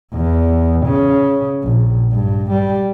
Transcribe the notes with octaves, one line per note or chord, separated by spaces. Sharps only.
E2
C#3
A#1
G2
G3